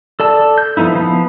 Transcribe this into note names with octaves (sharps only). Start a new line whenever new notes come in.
A4 D5 A5 E6
G6
F3 A3 B3 D#4 E4
F3 B3